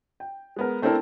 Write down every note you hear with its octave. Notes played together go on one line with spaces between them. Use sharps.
G5
G#3 B3 A#4
A3 C4 D4 E4 A4 A#4